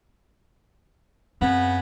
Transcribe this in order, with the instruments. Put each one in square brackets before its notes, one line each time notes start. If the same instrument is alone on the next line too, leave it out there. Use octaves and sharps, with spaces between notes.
[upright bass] F#2 C4 [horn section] C#3 B3